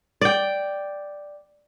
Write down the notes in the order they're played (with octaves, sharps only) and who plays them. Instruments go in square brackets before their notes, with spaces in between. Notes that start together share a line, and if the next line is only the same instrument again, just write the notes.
[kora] D5 G5